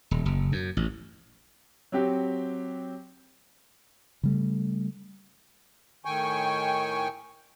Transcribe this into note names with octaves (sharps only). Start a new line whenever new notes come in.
D#1
F#1
F#2
A1
F#3 C4 G4
C#3 G3 A3
A2 D#3 G5 G#5 C#6